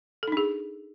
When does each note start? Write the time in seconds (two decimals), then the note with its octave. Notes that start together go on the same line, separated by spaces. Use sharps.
0.23 A4
0.28 D#4
0.32 D4
0.37 G#4